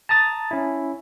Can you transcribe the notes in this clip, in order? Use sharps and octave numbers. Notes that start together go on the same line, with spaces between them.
A5 A#5 D#6 A6
C#4 E4